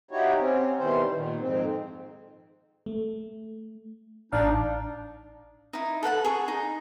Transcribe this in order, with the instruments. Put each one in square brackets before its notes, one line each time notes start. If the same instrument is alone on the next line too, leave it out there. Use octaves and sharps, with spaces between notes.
[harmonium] D#4 E4 F#4 G4 C#5
C4 C#4
B2 D#3 E3 G3 C5
A#2 D#3
F2 G#2 C4
[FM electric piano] A3
[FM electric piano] A1 F5 [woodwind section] D4 D#4
[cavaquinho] D#4 E4
A4 B4 F#5 A5
G#4 C#6
D#4